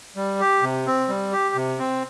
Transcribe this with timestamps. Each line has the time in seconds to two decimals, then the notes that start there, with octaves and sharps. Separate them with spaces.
0.16 G3
0.40 G4
0.62 C3
0.87 C4
1.09 G3
1.33 G4
1.55 C3
1.78 C4